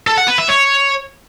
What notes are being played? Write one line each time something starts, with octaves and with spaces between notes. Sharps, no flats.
A4
F#5
B4
E5
C#5